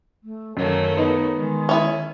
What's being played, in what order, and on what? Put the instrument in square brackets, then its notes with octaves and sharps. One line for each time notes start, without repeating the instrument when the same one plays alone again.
[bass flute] A3
[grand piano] F#2 [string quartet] D#3 A3 A#3 [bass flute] C#5
[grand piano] B3 D#4
[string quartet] D#3 [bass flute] G#3
[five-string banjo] C#4 E4 G#4